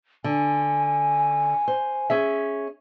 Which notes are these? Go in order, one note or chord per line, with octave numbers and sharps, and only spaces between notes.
D3 G#5
C5
C#4 G#4 E5